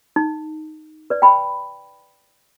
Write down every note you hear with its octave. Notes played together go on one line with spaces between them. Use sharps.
D#4
B4 D5
G5 B5